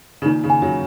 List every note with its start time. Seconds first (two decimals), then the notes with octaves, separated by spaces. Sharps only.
0.22 C#3
0.26 A#2 D#3 D#4
0.44 C#3
0.50 G#5
0.62 C#3 F#3